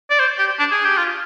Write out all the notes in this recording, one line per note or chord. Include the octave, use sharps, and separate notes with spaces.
D5
C5
G4
D4
G#4
G4
F4